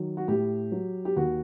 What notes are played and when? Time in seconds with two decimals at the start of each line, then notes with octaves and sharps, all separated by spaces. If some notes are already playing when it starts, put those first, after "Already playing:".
Already playing: D#3 F#3
0.17 F#4
0.28 A2 G4
0.72 F#3
1.05 G4
1.16 D#2 F#4